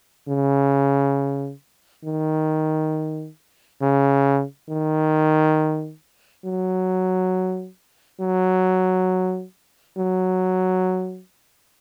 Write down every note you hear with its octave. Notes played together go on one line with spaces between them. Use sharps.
C#3
D#3
C#3
D#3
F#3
F#3
F#3